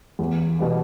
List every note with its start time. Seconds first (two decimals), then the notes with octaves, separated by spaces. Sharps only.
0.19 E2
0.59 B2 G3 B3